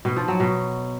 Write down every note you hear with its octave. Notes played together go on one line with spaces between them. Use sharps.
B2
F3
F#3
B2